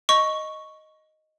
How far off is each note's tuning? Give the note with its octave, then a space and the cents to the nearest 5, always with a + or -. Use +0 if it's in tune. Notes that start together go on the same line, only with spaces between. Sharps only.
D#5 +0 C#6 +0